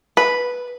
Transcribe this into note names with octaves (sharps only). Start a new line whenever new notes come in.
B4